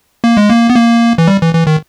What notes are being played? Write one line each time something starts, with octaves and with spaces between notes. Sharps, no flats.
A#3
G#3
A#3
B3
A#3
E3
G3
E3
E3
D#3